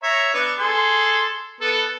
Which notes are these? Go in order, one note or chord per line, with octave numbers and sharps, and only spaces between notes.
C#5 E5 A#5
B3 D4
G#4 A4 C6
B3 A4